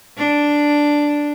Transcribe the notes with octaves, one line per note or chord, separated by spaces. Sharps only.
D4